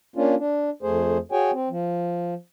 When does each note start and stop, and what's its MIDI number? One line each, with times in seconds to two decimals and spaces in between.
0.16 0.35 58
0.16 0.35 61
0.16 0.35 62
0.16 0.35 65
0.38 0.70 62
0.83 1.18 41
0.83 1.18 57
0.83 1.18 68
0.83 1.18 72
1.32 1.51 66
1.32 1.51 68
1.32 1.51 73
1.32 1.51 79
1.32 1.51 80
1.52 1.69 60
1.70 2.34 53